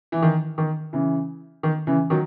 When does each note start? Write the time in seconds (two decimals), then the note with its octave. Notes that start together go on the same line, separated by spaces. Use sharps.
0.12 E3
0.22 D#3
0.58 D#3
0.93 C#3 E3
1.63 D#3
1.87 C#3 E3
2.10 D#3 F#3